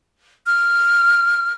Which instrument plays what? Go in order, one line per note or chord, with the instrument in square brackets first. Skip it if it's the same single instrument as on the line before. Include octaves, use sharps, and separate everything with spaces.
[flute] F6